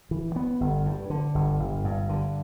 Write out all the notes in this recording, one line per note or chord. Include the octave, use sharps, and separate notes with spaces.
E3
B3
G1
G2
D3
G1
G1
G2
D3